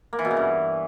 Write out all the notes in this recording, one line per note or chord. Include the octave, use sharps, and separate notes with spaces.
A#3
E3
B2
C#3
G2